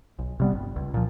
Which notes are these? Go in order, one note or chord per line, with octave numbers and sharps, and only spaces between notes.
B1
C3 G3 B3
G1
C#2
A#2 F3